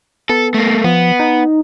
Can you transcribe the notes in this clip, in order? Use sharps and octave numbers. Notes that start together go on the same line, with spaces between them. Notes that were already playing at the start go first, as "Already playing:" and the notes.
B3 A4
A3 A#3
F3 B3
D#4